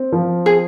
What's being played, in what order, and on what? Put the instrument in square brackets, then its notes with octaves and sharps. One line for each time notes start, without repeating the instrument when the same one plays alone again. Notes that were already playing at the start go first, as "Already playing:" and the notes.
Already playing: [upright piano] C4
F3
[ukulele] G#4